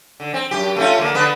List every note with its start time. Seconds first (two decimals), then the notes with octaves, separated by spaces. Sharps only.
0.20 D3
0.34 C4
0.51 F#2 G4
0.76 A3 C#4 F4
0.98 D3 A#3
1.14 D3 B3 B4